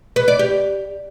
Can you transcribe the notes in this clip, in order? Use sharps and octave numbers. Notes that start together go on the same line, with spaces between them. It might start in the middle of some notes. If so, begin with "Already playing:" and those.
B4
D5
G4